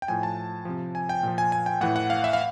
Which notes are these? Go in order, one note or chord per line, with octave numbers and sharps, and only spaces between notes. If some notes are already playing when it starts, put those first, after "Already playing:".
G5
A2 F3 G#5
A5
C3 F3
G#5
G5
A#2 F3
G#5
G#5
G5
A2 E3 F#5
F#5
F5
E5
F5